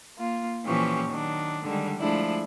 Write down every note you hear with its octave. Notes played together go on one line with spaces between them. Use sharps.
A#3 F4
A#2 E3 F3 C#4 G4 C#6
D#3 F#3 D4
D3 D#3 G3 G#3
F3 G#3 A3 D4 E4